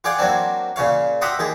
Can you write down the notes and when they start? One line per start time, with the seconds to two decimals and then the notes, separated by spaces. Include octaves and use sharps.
0.04 F4 G#4 D5 F#5 G5
0.18 F#3 A#3 C4 D4
0.76 A#2 C#3 C#5 F5
1.21 G4 E5 F#5 A#5 C6 D#6
1.39 D#2 G4 G#4